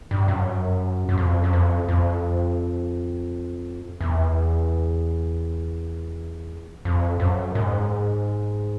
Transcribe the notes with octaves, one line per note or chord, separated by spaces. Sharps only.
G2
F#2
F#2
F2
F#2
F2
F2
E2
F2
F#2
G#2